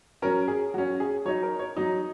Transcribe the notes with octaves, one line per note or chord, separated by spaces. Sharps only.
F#3 C#4 A#4
G#4
F#3 C#4 F#4
G#4
F#3 D#4 C#5
A#4
C#5
F#3 D#4 D#5